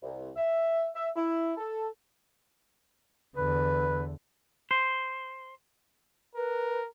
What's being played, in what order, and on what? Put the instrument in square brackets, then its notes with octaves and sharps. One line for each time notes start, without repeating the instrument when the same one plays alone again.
[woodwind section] C2
E5
E5
E4
A4
[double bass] E2 D3 [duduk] B4
[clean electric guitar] C5
[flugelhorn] A#4 [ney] B4